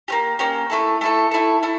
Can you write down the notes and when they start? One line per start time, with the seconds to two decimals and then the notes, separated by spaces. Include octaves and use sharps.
0.08 A#3 C#4 G4
0.39 A#3 C#4 G4
0.70 A3 E4 A4
1.01 A3 E4 A4
1.31 A3 E4 A4
1.63 A3 E4 A4